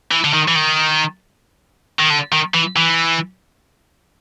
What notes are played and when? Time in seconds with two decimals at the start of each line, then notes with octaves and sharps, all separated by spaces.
0.11 E3
0.24 D3
0.33 D#3
0.48 E3
0.56 D#3
1.99 D#3
2.10 D3
2.32 D#3
2.54 E3
2.76 E3